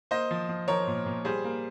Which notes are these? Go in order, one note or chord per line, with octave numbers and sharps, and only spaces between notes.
A#3 C5 D#5
F3
F3
F3 A#4 C#5
A#2
A#2
G3 G#4 C5
A#3